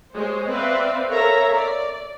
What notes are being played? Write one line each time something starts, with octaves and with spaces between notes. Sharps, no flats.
G#3 C5 C#5
C4 B4 C5 D5 E5 F5
A4 A#4 C#5 E5 F5 A#5
D5